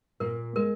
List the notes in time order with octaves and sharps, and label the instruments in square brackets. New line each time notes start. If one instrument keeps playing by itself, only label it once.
[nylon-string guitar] A#2 A#3 [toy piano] A#4
[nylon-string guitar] G#3 [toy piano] A#4